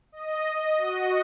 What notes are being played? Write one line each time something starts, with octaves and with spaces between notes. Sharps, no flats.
D#5
F#4